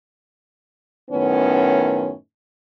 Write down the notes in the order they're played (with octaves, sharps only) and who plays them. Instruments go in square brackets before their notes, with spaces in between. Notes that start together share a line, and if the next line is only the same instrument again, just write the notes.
[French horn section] F#2 A2 D#3 B3 C#4